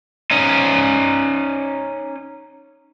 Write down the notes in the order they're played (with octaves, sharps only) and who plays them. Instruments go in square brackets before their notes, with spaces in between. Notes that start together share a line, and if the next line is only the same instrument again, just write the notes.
[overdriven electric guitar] C#4 D#4